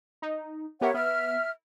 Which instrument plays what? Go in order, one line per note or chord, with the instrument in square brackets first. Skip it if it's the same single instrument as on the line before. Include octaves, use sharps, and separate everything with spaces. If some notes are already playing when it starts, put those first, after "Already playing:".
[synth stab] D#4
[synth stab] B3 G4 A#4 [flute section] C#5 E5 F#5
[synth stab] B3 [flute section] E5 F6